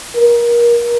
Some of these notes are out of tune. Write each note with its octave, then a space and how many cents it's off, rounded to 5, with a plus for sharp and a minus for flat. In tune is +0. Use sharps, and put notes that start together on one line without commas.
A#4 +25